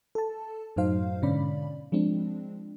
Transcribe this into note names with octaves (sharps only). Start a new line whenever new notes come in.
A4 A5
F#2 A2 F#3 D#4 C5 F5
G#2 B2 D3 C#4 D5 B5
F3 G#3 C4 D4